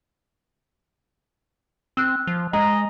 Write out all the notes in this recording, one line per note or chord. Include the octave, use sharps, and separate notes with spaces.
C4 E6 F#6
F3
G#3 D#5 A#5